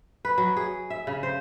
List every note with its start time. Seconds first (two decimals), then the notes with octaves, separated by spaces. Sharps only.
0.25 B4
0.38 F#3
0.57 G#4
0.90 E5
1.07 C#3
1.23 C5